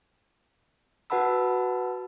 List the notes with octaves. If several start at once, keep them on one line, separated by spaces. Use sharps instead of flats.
F#4 B4 F#5 A5 B5 E6